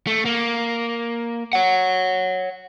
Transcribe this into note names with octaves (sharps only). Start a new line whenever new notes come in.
A3
A#3
C#5 F#5